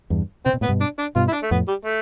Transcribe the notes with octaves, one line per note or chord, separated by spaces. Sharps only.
E2 G2
C3 C4
B2
A2 B3
G2 B2
D4
D4
G2 B2 F4
E4
D4
A3
F2 A2 B3
G3
A3